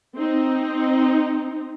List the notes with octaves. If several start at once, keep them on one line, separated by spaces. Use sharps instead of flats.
C4 D#4